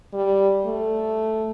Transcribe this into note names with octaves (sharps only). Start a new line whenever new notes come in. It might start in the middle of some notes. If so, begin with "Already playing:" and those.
G3
A3